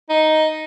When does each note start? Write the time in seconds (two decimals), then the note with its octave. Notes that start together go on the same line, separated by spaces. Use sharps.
0.10 D#4